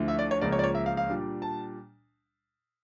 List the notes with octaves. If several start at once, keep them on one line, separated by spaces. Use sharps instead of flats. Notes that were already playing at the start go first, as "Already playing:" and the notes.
Already playing: D2 D3 F3 A3 E4
E5
D5
C#5
C#2 C#3 F3 A#3 D5
C#5
D5
C#5
E5
F5
F5
A#2 G3 D4
A5